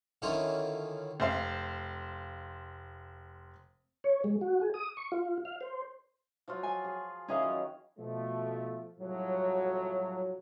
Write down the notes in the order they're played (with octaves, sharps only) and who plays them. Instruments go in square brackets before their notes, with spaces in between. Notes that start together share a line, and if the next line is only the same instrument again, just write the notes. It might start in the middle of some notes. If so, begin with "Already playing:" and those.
[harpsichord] D3 D#3 C#4 E4 F4 D#5
[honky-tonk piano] F1 C5 F5
[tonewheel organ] C#5
G#3
F#4
G#4
D#6
C#6
F4
F5
C5
[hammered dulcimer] F3 F#3 F4
[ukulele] G#5
[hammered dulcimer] G#4
[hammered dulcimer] D#3 E3 F4 [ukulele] C#4 G#4 F5
[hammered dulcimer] F#3
[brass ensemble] B2 F3 A3
C2 A2 F3 F#3